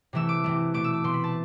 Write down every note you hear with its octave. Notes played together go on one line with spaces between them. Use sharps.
C3 E3 A3 E6
D6
C3 E3 A3
B2 A3 D6
E6
D6
B2 A3 C6
B5
A5